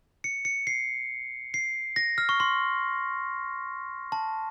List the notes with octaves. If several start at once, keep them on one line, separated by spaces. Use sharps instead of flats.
C#7
C#7
C7
C7
A#6
F6
C#6
C6
A5